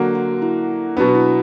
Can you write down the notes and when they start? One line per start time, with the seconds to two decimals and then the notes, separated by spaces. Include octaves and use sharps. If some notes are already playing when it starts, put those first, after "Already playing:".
Already playing: D3 F#3 A#3
0.15 F#4
0.42 E4
0.97 B2 F#3 B3 D4
1.08 F#4
1.15 E4